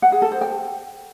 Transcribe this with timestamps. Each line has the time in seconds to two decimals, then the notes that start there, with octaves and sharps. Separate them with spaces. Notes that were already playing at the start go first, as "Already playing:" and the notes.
0.02 F#5
0.12 G#4
0.22 A4
0.32 C5
0.41 G5